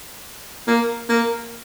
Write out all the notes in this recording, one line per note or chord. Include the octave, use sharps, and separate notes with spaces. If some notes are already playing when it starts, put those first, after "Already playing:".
A#3
A#3